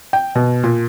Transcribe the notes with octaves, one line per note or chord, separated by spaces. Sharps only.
G5
B2
A#2